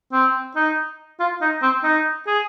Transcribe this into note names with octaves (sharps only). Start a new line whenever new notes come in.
C4
D#4
F4
D#4
C4
D#4
G#4